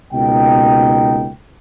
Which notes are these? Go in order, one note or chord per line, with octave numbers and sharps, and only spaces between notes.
C#2 B2 A#3 D#4 G5